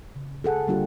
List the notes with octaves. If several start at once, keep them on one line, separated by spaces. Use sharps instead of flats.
C#3
G#4 A4 F#5
D3 G3 A#3 D4 F4 G4